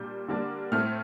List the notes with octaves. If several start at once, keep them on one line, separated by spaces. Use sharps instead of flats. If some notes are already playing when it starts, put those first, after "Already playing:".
Already playing: A#2 G3 D4 G6
D3 G3 A#3 D4
A2 A3 C4 F6